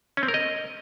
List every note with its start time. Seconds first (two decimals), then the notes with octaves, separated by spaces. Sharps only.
0.17 C#4
0.23 C4
0.28 A#4
0.34 D#5